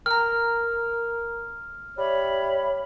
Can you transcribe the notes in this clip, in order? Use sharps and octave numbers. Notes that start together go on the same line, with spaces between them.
A#4 G5 A#5 F6
G3 C#5 E5 B5